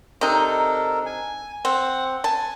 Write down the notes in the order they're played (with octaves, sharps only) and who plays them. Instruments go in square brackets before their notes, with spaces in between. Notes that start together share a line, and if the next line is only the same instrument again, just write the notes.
[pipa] C3 D#4 [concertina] D4 A4 A#4
[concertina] G#5
[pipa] C4 [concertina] F#5
[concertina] G#5 [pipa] A5